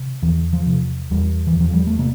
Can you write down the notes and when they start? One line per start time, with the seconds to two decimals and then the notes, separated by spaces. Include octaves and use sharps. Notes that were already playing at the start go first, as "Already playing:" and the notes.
Already playing: C3
0.22 E2 E3
0.53 F3
0.66 C3
1.11 E2 G3
1.47 E3
1.55 E2 F3
1.74 G3
1.87 A3
1.99 C3 A#3